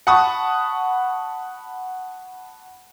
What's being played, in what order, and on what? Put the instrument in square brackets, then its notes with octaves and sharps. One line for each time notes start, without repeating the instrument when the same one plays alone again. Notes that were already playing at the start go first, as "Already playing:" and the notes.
[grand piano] F#5 A5 B5 C#6 D#6